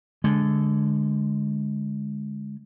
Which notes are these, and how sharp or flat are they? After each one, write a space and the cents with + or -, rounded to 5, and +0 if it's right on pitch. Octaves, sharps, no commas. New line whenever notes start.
D3 -10 G#3 +0